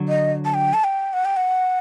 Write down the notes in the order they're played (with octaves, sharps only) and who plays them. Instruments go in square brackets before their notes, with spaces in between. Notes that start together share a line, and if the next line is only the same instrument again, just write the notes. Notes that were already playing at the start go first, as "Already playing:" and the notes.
Already playing: [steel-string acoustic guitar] D3 F#3
[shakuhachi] D#5
A5
G5
A5
G5
F#5
G5
F#5